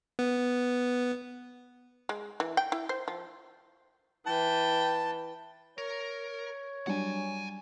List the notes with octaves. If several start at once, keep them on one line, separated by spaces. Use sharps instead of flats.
B3
G#3
E3
G5
E4
C5
F3
E3 G5 A5
A#4 C#5
F#3 G3 D4 F#5 G#5